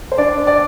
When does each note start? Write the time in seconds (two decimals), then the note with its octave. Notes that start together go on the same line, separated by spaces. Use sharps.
0.12 C5
0.18 D4 D5
0.47 D5